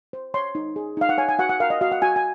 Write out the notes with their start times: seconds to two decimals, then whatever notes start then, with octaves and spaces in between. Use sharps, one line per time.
0.13 C5
0.34 C#5 C6
0.55 D#4
0.76 G#4
0.97 D#4 F5
1.09 F#5
1.18 C#5 G#5
1.29 G#5
1.39 F#4 F#5
1.49 F#5
1.60 A#4 F5
1.70 D#5
1.81 F#4 F5
1.92 F#5
2.02 F#4 G#5
2.16 G#5